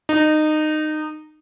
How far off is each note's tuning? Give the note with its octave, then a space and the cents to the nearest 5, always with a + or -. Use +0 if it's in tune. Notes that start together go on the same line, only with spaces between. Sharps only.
D#4 -20